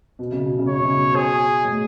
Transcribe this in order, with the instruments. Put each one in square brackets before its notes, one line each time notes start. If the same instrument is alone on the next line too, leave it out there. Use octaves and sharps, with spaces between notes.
[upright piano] B2
C#3
B2
C#3
[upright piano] B2 [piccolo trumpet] C#5
[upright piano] C#3
B2
[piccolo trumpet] G#4
[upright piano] A2